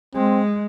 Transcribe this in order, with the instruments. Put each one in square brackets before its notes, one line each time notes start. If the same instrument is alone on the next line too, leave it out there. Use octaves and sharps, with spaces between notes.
[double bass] G#3 [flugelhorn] C4